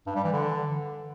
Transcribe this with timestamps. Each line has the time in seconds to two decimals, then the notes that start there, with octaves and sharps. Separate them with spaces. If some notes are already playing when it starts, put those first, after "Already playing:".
0.06 G2
0.15 G3
0.24 E3
0.33 D3